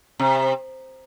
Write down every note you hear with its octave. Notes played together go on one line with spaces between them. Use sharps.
C3